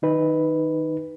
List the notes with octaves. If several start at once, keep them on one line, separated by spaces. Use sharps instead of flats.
D#3 D#4 B4